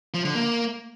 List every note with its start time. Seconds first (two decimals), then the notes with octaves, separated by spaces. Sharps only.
0.14 F3
0.25 D3
0.35 A#3